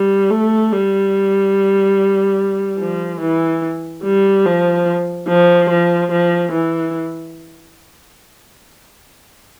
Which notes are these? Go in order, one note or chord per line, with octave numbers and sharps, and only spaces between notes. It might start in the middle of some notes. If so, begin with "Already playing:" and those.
Already playing: G3
A3
G3
F3
E3
G3
F3
F3
F3
F3
E3